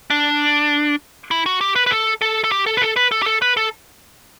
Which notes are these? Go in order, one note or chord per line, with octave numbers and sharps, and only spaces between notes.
D4
E4
F#4
G4
B4
B4
A4
A4
A4
G4
A4
B4
A4
B4
A4
G4
A4
B4
A4